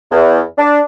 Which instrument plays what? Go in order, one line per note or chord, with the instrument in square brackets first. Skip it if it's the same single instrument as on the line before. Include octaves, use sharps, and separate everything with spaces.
[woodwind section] E2
D4